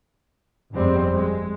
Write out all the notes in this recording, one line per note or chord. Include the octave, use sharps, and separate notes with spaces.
G1 F2 G3 G#3 C4
G#3